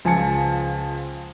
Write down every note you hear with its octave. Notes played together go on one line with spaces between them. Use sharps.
C#2 F3 G#5 A5 C#7